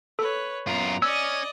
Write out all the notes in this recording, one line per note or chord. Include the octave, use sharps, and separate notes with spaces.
A4 B4 C#5
F#2 B3 F4 A#5
C#4 D5 D#5 E6